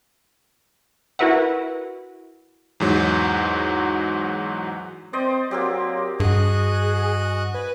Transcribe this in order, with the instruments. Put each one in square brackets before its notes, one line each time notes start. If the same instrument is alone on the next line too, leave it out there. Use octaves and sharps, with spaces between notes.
[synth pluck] E4 F#4 A#4 B4 E5 F#5
[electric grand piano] E2 G#2 F#3
[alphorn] C4 [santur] C5 D5 D#5
[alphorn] F#3 [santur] A#3 C4 G4
[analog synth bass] G2 [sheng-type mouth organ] F#4 D#5 F#6 [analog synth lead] G#4
[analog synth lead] B4 [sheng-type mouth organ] G#5